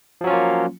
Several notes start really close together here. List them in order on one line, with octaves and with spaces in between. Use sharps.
F3 F#3 C#4 F4 A#3